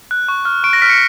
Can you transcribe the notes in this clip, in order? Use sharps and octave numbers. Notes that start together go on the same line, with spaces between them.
F#6
C#6
F6
C#6 D7
A#6
F6 B6
C#7